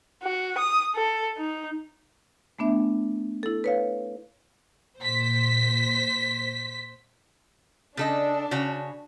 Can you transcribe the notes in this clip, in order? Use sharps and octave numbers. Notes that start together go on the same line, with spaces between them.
F#4
D#6
A4
D#4
A3 B3 D4 E5
E4 A4
B4 C#5 F5
A#2 C5 B6
C#3 D4 A4 D#5
C#3 F#4 C#5